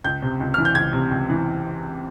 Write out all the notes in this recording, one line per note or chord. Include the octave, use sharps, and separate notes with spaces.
C#2 G6
C3
C#2
E3 F6
G6
C#2 G#6
C3
C#2
E3